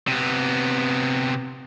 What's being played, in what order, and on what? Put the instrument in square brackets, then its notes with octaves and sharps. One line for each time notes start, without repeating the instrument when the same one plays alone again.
[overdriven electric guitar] C3 B3